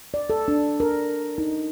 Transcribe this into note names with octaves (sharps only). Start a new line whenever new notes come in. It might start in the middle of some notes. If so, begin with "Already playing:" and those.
D5
A4
D4
A#4
D#4